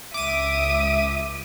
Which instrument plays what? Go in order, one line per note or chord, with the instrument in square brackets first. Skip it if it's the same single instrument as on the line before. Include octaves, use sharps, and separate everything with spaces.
[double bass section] C#2 [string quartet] E5 D#6 [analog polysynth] D6 D#7